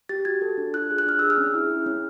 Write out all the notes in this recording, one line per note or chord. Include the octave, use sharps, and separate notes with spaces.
G4 A6
F#4 G#6
A4
D4
F4 F#6
G#4
F#6
D4 F6
G#4 E6
F6
C#4
E4
G#4
C#4